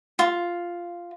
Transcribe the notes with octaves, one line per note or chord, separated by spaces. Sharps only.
F4